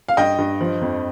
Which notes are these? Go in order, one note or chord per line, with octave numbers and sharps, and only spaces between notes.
F5
G2 D#5 G5
G2
F3
F2